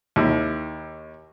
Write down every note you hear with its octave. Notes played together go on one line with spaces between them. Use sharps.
D#2 E4